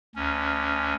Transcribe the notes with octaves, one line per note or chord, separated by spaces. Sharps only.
D2 C#4